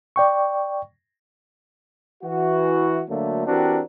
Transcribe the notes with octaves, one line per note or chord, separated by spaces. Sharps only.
D5 G5 C#6
E3 F#4
D2 D3 F#3 A3 A#3
E3 C4 D4 F#4 G4 A#4